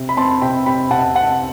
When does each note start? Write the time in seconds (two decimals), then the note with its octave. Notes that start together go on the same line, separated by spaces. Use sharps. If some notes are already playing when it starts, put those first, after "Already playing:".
Already playing: C3
0.09 B5
0.17 C4 A5 C6
0.42 C3 G5 B5
0.66 C3 G5 B5
0.91 C3 F#5 A5
1.15 C4 F#5 A5